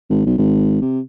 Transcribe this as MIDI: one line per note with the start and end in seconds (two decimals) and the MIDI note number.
0.10 0.24 32
0.26 0.37 35
0.38 0.78 32
0.81 1.00 48